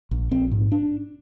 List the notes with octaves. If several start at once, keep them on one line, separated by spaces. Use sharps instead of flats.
A#1
A#1 C4
G#2
D4